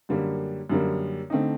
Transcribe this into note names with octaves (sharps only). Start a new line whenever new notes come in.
F#2 D3 G3 A#3
F#2 D3 G3 A#3
D3 A3 C4 D#4